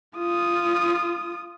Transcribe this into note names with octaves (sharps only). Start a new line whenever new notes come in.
F4 D#6